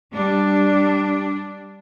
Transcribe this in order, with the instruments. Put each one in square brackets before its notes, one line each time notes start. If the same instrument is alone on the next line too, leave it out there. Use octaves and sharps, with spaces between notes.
[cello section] G3 D4